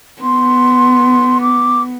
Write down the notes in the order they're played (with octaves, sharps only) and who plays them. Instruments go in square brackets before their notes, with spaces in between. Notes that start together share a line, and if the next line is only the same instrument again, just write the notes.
[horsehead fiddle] B3 [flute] C6
[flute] D6